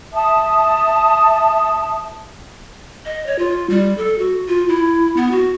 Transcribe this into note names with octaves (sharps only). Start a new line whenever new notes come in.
E5 A5 D#6
D#5
C#5
F4
G3
A4
F#4
F4
E4
B3
F#4